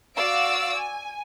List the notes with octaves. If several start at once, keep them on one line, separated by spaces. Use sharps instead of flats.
F#4 D5 F5 E6 D7
G#5